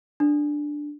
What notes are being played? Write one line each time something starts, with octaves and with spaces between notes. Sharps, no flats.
D4